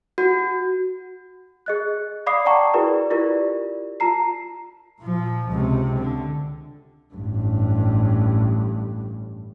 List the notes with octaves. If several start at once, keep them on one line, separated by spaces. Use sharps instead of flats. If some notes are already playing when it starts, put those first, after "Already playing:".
F#4
G#4 D#5 F#6
D5 F5 B5 D6 D#6 C7
D5 F#5 G5 A5 A#5 C#6
E4 F#4 G#4 A#4 B4 D5
E4 F4 G4 A#4 D5
F4 A5 A#5 C7
A#2 F3
C#2 C3
D3
A1 G2